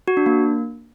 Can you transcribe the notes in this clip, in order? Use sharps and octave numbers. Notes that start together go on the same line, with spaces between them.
F#4
D4
A#3